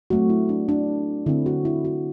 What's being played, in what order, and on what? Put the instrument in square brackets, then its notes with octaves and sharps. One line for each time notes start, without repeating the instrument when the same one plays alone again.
[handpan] F#3 A3 C4 F#4
E4
D4
D4
D3 A3 C4 E4
F#4
E4
F#4